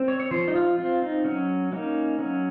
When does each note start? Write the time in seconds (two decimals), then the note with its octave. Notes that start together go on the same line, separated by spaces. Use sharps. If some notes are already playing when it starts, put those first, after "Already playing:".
Already playing: C4
0.08 C#5
0.20 C#5
0.31 F3 C5
0.48 D#4
0.55 F4
0.78 C4 F4
1.02 D#4
1.24 F#3 C#4
1.72 A#3 C#4 D#4
2.19 F#3 C#4